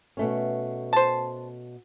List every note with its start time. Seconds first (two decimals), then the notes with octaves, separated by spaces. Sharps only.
0.17 B2 A3 C#4
0.93 C5 A5